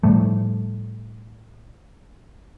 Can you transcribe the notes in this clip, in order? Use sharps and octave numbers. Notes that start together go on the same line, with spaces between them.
A2 F3 G3 A3